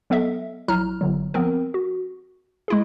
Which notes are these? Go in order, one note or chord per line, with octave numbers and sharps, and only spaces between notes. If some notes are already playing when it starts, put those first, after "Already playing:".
F#3 B3 A4 D#5 E5
A#1 F#3 E4 A#5 F6
G1 D3 F#3
F3 B3 C4 A#4
F#4
G#3 E4 G#4